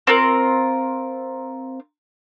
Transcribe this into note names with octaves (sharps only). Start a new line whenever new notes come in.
C4 F4 A#4